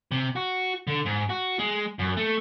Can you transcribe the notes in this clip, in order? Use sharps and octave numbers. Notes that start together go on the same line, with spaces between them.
C3
F#4
D3
G#2
F#4
G#3
F#2
A3